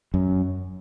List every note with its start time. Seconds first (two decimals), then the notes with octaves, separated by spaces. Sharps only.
0.14 F#2